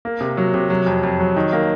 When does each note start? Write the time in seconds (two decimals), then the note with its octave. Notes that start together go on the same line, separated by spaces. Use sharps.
0.05 A#3
0.21 C3
0.37 F#3
0.54 C3
0.70 F#3
0.86 F2
1.03 F2
1.20 F#3
1.36 D#3
1.53 A#3